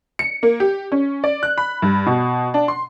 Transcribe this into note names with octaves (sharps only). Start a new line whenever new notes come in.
C#7
A#3
G4
C#4
D5
F#6
B5
G2
B2
D4
C6